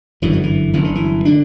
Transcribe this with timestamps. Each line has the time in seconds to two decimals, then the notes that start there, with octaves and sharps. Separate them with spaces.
0.22 G1 F#2 D3 E3
0.33 F#3
0.43 E3
0.73 G1 F#2 D3 E3
0.84 D3
0.95 E3
1.25 D3 D4